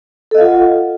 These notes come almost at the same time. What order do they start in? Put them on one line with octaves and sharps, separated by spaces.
A4 D#5 F5 F4 F#5